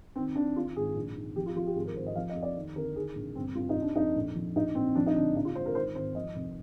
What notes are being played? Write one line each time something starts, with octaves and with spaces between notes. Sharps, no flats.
D#3 C4
D#3 D4
D#3 F4
G#1 G#4
A#1
D#3
F3 G4
F4
F3 F4
G4
G#1 G#4
A#4
G#1 C5
D#5
F3 F5
D#5
F2
D5
D#2
D3 A#4
D#3 G#4
A#1
G1 C4
G2 F4
D#4
C3
D4
F2 D#4
A#1
F3
A#1 D#4
A#1 C4
F3 D4
D#4
D3 D4
A#1 D#4
F4
G#2 C5
A#4
D#3 C5
G#1 C5
F3 D#5
F1